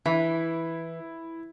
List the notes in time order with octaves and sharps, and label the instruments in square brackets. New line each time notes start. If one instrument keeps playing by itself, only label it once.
[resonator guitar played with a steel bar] E3 [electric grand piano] E4